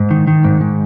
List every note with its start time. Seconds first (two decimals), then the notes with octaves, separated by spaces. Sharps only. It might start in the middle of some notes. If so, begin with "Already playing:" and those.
Already playing: G#2
0.11 D#3
0.27 D#3
0.44 G#2
0.61 G#2